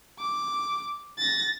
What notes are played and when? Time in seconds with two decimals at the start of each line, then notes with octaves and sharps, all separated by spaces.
0.19 D6
1.19 A6 A#6